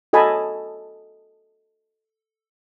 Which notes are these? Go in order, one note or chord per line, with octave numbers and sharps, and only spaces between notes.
F#4 A4 D#5 G#5 A5 B5